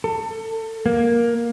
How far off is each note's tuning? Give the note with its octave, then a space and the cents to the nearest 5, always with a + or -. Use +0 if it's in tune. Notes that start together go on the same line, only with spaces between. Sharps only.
A4 +25
A#3 +10